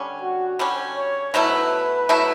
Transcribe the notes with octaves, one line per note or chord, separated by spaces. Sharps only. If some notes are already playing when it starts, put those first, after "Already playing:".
Already playing: D3 G3 C#4
F#4
D3 G3 C#4
C#5
B2 F#3 A3 E4 B4
B2 F#3 A3 E4